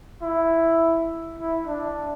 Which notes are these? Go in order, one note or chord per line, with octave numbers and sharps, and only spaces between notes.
E4
E4
D4